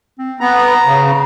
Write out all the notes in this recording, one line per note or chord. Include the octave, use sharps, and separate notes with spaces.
C4
B3 A#5
C#3